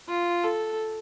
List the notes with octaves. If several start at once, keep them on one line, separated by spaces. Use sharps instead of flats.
F4
A4